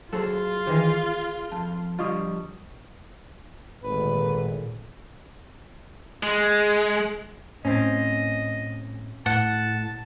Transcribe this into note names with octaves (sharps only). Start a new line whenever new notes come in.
F#3 F4 G#4 A4 C5
D#3 E3 G#4 C5 D#5 G#5
F2 A5
D3 F3 G3 F4 D#5 C#6 D#6
G#1 A#2 D3 A3 B4
G#3
A2 C4 C#4 D#5
A2 F#5 A5